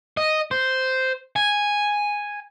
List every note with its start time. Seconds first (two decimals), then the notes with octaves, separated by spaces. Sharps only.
0.17 D#5
0.51 C5
1.36 G#5